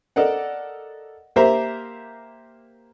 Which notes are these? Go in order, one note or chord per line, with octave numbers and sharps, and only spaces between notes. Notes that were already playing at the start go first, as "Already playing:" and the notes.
A4 A#4 D5 D#5 F#5
A#3 G4 A#4 C5 E5 A#5